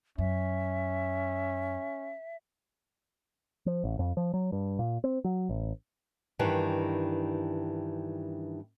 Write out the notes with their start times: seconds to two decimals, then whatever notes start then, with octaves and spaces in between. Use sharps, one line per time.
0.18 F#2 C#4 E5
3.66 F3
3.84 A1
3.99 F2
4.17 F3
4.34 F#3
4.52 G2
4.79 A#2
5.04 C4
5.24 F#3
5.49 A1
6.39 G2 D#3 E3 G3